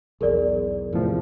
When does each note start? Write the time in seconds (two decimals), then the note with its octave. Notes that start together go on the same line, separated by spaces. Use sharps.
0.21 B1 E2 G#4 A#4 D5
0.93 E2 A2 C3 F3